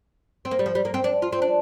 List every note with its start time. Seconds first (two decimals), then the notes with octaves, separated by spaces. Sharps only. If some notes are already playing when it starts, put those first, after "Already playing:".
0.45 C4
0.51 A#3
0.59 G3
0.66 F3
0.75 G3
0.85 A#3
0.94 C4
1.04 D4
1.22 F4
1.33 C4
1.42 D4